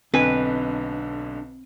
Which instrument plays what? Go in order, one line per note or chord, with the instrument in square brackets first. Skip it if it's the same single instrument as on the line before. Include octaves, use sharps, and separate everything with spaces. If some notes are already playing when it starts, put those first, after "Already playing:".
[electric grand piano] B1 D3 D#5 [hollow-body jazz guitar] C4 G#5 [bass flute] D4 [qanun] B4